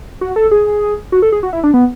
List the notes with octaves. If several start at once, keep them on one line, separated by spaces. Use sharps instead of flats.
F#4
A4
G#4
F#4
A4
G#4
F#4
E4
D4
B3